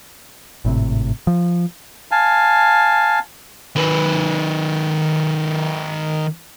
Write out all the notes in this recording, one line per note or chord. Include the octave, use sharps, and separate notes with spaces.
G#1 A2 C3
F3
F5 G#5 A5
D#3 B4